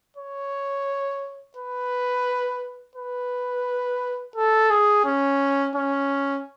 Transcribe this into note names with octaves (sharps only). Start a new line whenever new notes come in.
C#5
B4
B4
A4
G#4
C#4
C#4